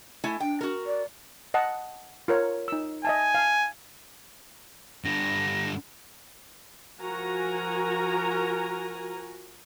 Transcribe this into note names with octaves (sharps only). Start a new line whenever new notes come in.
A3 E4 G#5
D4 G5
F#4 A#4
D5
D#5 F#5 A5
F4 A#4 C#5
D#4 E6
D#5 E5 G#5 A5
F5 A5
G2 D3 A#6
F3 F#4 A#4 G#5 A#5